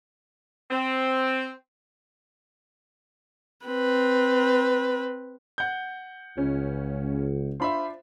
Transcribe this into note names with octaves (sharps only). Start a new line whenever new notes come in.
C4
C4 B4
F#5 G6
C#2 C#3 C#4
D4 F4 C5 E5 B5 C6